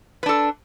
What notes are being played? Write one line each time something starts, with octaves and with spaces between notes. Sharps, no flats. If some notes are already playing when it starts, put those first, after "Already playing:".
D4 A4 B4